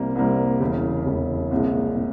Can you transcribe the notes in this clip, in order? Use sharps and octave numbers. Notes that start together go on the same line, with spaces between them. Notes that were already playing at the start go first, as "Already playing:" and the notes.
Already playing: C2 C3 G3 A#3
C2 C3 G3 A#3
E1 E2 C#3
E1 E2 C#3
C2 A#2 G#3
A#2